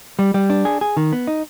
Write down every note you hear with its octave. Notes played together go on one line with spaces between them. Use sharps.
G3
G3
D4
G#4
G#4
D#3
B3
D#4